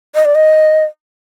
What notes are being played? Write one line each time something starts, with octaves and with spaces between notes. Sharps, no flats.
D#5
D5
D#5